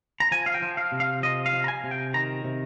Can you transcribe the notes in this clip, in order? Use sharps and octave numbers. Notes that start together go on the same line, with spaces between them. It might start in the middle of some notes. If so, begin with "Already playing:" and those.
A#5
F3 G#5
F5
G5
F3
F5
C3
F5
F3 D#5
F5
F3
A#5
G#5
C3
G5
D#3 A#5
C3